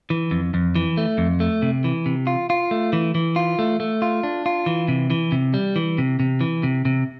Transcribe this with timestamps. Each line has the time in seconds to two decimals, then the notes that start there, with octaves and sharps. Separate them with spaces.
0.10 E3
0.31 F2
0.54 F2
0.75 E3
0.97 A3
1.18 F2
1.40 A3
1.62 C3
1.84 E3
2.06 C3
2.27 F4
2.50 F4
2.71 A3
2.93 E3
3.15 E3
3.36 F4
3.59 A3
3.80 A3
4.02 F4
4.23 D4
4.46 F4
4.66 E3
4.88 C3
5.10 E3
5.32 C3
5.54 G3
5.76 E3
5.98 C3
6.20 C3
6.41 E3
6.63 C3
6.85 C3